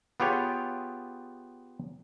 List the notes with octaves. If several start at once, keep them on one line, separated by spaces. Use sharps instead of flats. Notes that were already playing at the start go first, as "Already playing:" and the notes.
B3 F4 G4 G#4 C#5